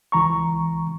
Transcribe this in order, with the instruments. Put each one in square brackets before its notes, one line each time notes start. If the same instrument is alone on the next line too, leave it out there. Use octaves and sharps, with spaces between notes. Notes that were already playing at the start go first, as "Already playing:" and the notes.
[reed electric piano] C#2 E3 A#5 C#6